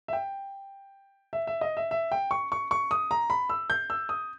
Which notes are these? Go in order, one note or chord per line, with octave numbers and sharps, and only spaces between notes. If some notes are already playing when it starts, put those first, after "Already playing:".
E5
G5
E5
E5
D#5
E5
E5
G5
C#6
C#6
C#6
D#6
A#5
B5
E6
G6
E6
D#6